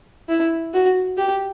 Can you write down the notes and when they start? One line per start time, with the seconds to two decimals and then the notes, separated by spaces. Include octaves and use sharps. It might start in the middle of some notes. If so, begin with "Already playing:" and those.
0.29 E4
0.74 F#4
1.17 G4